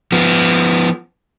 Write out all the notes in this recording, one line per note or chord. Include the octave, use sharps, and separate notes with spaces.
F3 B3